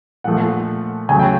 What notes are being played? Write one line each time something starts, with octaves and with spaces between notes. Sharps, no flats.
A#2 F3 A3 F#5
C#3 F#3 A3 G#5
G5